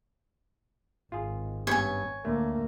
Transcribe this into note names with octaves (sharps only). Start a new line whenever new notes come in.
G#1 F4 G#4
G2 B3 C#4 C#5 G#5
D2 D3 A3 A#3